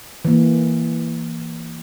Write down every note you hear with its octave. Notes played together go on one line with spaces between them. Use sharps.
E3 A#3